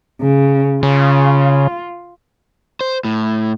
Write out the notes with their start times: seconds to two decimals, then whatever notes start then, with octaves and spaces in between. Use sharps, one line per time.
0.21 C#3
0.83 C#3 F4
2.81 C5
3.05 A2